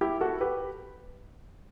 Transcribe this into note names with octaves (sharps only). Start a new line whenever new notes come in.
E4 G4
F#4 A4
G4 B4